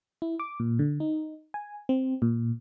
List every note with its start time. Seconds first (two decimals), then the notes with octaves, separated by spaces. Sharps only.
0.22 E4
0.40 D6
0.60 A#2
0.79 D3
1.00 D#4
1.54 G#5
1.89 C4
2.22 A#2